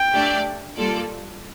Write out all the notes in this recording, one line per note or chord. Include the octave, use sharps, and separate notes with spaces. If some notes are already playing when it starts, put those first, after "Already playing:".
Already playing: G5
A3 D4 G4 D5
G3 A#3 F4 A4 D5